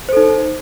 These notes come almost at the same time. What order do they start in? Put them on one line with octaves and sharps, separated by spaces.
C5 A4 D#4